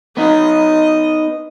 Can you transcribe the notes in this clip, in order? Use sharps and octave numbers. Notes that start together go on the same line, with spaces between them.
B3 D#4 D#5